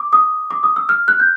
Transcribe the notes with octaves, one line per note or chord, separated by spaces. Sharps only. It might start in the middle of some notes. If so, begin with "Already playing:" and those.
Already playing: D6
D#6
D6
D#6
E6
F6
F#6
G6